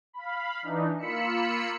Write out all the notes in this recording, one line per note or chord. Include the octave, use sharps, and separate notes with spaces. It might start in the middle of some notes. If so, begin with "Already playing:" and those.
F5 B5
E3 D4 D#4
A#3 F4 B5 E6 C#7